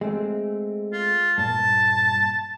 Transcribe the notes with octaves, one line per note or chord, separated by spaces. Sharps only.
G#3 A3 C4
F4
G2 A#2 A5